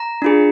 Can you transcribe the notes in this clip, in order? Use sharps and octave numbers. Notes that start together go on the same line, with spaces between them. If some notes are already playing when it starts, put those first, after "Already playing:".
Already playing: A#5
D4 F4 G#4